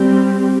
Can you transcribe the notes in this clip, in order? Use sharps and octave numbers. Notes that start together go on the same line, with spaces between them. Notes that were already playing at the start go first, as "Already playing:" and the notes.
Already playing: G3 C4 G4